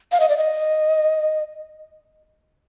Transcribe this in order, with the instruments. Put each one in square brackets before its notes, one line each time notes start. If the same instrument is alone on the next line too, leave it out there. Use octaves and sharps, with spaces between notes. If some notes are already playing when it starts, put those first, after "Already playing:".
[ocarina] F5
D#5
D5
D#5